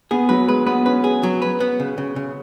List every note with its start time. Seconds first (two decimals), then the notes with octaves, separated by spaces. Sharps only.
0.11 B3 G#4
0.29 F#3 B4
0.48 G#3 B4
0.66 B3 B4
0.85 C#4 B4
1.04 G#4
1.23 F#3
1.42 B4
1.60 B3
1.80 C#3
1.98 C#3
2.16 C#3